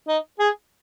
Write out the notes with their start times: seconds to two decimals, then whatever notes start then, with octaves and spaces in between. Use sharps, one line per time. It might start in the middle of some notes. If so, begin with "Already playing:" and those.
0.08 D#4
0.39 G#4